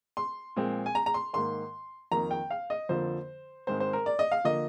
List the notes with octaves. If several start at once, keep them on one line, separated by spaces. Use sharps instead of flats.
C6
A#2 F3 G#3 C4
G#5
A#5
A#5
C6
G#2 D#3 A#3 C6
F2 D#3 A#3 A#5
G5
F5
D#5
F2 D3 F3 A#3 C5
G#2 D#3 G#3 C4 C5
C5
A#4
D5
D#5
F5
D3 F3 A#3 D#5